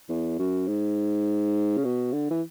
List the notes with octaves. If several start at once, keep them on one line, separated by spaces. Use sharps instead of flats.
E2
F#2
G#2
C#3
B2
D3
E3